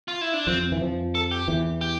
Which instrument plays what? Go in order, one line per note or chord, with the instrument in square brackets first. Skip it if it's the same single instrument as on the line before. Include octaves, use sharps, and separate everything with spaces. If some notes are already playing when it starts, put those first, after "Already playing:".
[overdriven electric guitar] F4
E4
D4
[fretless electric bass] F2 F3 [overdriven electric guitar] C4
[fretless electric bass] E3
F2 F3
[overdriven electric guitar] A4
G4
[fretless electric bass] E2 E3
[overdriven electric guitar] G4